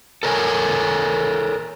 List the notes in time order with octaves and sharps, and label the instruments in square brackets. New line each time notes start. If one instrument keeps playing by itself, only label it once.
[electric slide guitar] A4 A#4 C#5 G#5